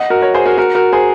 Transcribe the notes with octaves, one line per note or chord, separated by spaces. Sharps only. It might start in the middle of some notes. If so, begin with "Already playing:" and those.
Already playing: D#5 F#5
F#4 A#4
A#4 C#5
G#4 C5
F#4 A#4
F#4 A#4
F#4 A#4
G#4 C5